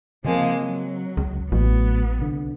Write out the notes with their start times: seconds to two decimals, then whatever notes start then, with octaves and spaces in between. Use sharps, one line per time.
0.24 C#3 F3 G#3 A#3 C4
0.59 F#3
1.17 C#2
1.52 A1 A2 F#3 B3
2.19 C2 D3